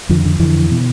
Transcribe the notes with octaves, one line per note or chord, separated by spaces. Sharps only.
F2 D3 F3
D3
F2 D3 E3
B2